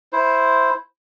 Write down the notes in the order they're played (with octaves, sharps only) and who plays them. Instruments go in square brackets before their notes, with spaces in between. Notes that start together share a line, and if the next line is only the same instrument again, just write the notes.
[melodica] E4 C5